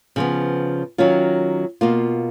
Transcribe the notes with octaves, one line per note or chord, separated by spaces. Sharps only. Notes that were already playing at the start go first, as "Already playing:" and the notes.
C#3 F3 B3
D#3 F#3 C#4 F4
B2 A#3 F4